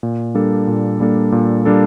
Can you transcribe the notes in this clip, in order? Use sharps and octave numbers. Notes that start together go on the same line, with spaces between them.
A#2
G3 A#3 D4 A4
A#2
G3 A#3 D4 A4
A#2
G3 A#3 D4 A4